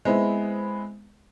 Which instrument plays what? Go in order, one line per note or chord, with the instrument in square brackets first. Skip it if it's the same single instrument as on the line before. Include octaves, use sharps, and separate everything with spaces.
[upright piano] G#3 B3 C4 E4